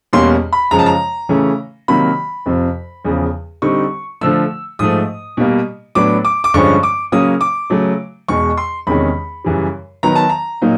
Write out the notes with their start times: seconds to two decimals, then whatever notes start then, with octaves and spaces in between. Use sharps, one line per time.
0.13 E2 B2 G3 A#3 C#4 C6
0.53 B5
0.71 F#2 C#3 F3 G#3 A#5
0.79 A5
0.86 A#5
1.29 C#3 E3 A3 C#4
1.88 C3 D#3 F#3 A#3 B5
2.46 F2 C3 F3
3.05 E2 C#3 F3
3.62 D3 G3 C4 D#4 C#6
4.21 D3 F3 A3 E6
4.79 G#2 F3 A3 D#6
5.37 B2 G3 A#3
5.95 A2 F#3 B3 D4 D6
6.25 D6
6.44 D6
6.54 G2 D3 F3 G#3 C#4 C#6
6.83 D6
7.12 C#3 F#3 A#3 C#4 D#6
7.41 D6
7.70 C#3 F#3 A3
8.28 E2 B2 G#3 C#6
8.57 C6
8.87 E2 C3 D#3 G#3 C#4 B5
9.44 F#2 C#3 E3 G3
10.03 D#3 F#3 B3 A#5
10.15 A5
10.29 A#5
10.62 A#2 F#3 A#3 D#4